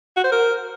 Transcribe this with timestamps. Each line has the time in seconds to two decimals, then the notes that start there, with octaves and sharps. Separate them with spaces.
0.16 F#4
0.24 C5
0.32 A#4